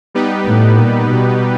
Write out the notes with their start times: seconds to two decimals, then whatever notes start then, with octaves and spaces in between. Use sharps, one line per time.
0.14 G3 B3 D#4 G4 B4
0.46 A2
0.78 A#2
1.09 B2